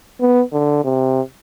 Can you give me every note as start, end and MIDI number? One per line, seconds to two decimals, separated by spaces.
0.20 0.43 59
0.53 0.83 50
0.85 1.21 48